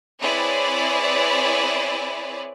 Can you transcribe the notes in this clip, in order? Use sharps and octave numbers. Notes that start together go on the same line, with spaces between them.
C4 E4 G#4 B4 C#5 D5